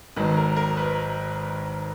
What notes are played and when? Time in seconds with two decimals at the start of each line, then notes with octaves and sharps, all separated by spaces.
0.16 G#1 G#2 D#3 F#3 B4
0.37 A#4
0.57 A#4
0.77 B4